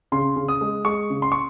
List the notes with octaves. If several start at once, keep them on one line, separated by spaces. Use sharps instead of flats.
C#3 C6
C#3
D#6
G#3
G#3 C#6
C#3
C6
C#6